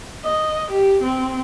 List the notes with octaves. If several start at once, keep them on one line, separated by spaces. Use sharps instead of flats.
D#5
G4
C4